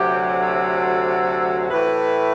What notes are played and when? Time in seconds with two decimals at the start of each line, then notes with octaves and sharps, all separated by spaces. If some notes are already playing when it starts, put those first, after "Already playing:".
Already playing: D2 C3 F#3 G4
0.41 A4
1.70 A2 E3 A3 B4